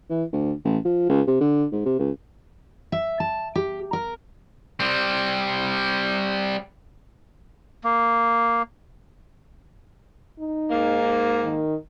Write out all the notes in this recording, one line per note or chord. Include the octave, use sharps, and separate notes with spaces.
E3
D2
A1
F3
C#2
C3
D3
G#2
C3
C#2
E5
A5
G4
A#4
G3 C4
A#3
D#4
G#2 A#3
D#3